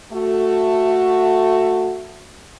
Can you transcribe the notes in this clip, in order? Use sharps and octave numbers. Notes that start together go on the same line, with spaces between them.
A3 F#4